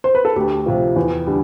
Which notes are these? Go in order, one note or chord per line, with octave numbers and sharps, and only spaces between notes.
C5
B4
A4
D2 G4
C3 F3
E2
D3 G3